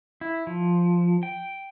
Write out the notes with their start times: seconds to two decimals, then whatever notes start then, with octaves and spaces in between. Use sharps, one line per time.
0.21 E4
0.47 F3
1.23 G5